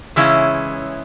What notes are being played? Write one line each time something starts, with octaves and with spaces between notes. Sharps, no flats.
C#3 E3 G#3 C#4 E4